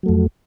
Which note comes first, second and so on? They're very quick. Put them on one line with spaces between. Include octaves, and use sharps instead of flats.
F#3 A3 F2